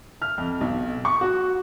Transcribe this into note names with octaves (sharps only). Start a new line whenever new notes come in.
F6
F2
B1
C#6
F#4